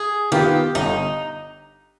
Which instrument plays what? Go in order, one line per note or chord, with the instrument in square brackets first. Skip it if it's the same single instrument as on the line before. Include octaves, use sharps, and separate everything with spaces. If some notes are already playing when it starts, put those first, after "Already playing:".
Already playing: [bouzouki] G#4
[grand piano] D#3 B3 F4 [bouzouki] G4
[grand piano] G1 [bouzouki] D#4